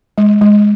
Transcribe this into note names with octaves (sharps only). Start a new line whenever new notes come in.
G#3
G#3